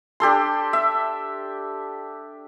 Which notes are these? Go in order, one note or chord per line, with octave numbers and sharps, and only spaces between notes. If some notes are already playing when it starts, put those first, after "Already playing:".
D4 G4 A4 C6
E5